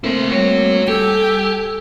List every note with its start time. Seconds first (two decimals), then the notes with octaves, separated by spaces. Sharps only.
0.04 A3 A#3 C4 E4 C5
0.32 G3 F#4 C#5
0.88 G4 A4 G5 G#5